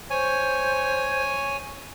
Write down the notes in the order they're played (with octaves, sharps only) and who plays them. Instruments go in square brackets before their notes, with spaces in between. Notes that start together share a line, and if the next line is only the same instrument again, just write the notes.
[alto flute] C5 [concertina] C#5 G#5